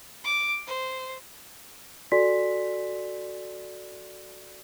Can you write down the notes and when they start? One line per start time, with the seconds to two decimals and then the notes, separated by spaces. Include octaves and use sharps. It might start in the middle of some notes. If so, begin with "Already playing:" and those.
0.24 D6
0.67 C5
2.12 F#4 A4 D5 G#5 C6 B6